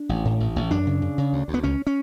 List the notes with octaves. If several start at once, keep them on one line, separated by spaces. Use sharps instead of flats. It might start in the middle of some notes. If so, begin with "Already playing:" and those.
Already playing: D4
A1
A2
A1
A1
F#2 D4
C#3
C#3
C#3
D2
D2
B3
C#2 C#4
C#4